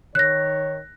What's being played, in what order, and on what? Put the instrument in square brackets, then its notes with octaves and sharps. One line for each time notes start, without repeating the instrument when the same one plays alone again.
[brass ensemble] D#3 C#5 [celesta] F#6 A#6